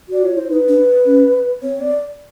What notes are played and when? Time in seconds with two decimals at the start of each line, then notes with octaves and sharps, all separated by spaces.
0.09 F#4 D5
0.23 F4 C#5
0.37 E4 C5
0.50 D#4 B4
0.68 D4
1.06 C#4
1.62 C4 C#5
1.81 D5